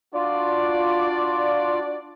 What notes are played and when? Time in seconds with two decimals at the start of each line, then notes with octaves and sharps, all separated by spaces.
0.15 D4 F4 F#4 D5